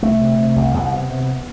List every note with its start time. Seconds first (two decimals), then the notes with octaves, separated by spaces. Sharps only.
0.02 C2 A3
0.21 C3
0.39 C3
0.56 C2
0.74 C2 B3
0.92 C3
1.10 C3